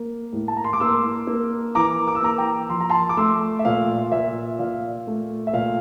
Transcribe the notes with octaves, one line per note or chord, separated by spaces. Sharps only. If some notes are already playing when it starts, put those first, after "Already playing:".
Already playing: A#3
A2
A5
A#5
C6
D6
A#3 C6 E6
A#3
E3 A#5 D6
D6
E6
A#3 A#5 D6
G5 A#5
F3 C6
A#5
A5 C6
D6
A3 C6 E6
E5
A#2 F5
A#2 E5
A#2 F5
A3
E5
A#2 F5